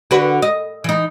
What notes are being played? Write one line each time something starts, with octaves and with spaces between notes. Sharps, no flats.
D3 F#4 B4
D#5
E3 D#4